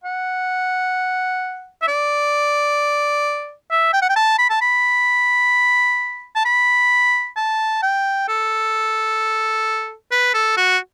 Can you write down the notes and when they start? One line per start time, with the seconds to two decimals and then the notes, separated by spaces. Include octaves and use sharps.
0.04 F#5
1.82 E5
1.88 D5
3.71 E5
3.93 G5
4.02 F#5
4.09 G5
4.16 A5
4.39 B5
4.50 A5
4.61 B5
6.35 A5
6.45 B5
7.37 A5
7.83 G5
8.28 A4
10.11 B4
10.34 A4
10.57 F#4